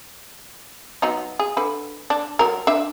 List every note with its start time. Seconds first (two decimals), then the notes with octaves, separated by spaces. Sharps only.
1.02 F#3 B3 D#4
1.39 G#4
1.57 D3 B4
2.10 D4
2.39 F#3 A#4
2.67 D4 E5